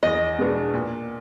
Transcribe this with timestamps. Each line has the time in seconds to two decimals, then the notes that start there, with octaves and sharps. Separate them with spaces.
0.03 E2 D#5
0.39 B2 G#3 B3 D4
0.74 A#2